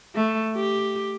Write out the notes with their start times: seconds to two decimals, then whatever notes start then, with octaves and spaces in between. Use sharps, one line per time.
0.15 A3
0.55 G4